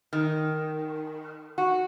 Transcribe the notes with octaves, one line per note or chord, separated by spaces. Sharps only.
D#3
F#4